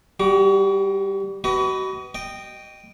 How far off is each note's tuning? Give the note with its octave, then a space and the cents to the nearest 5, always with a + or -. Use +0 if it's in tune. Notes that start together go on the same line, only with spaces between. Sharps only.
G3 +0 F#4 +35
F#4 +40 B4 +0 D#5 +0
D#5 -15 G5 +0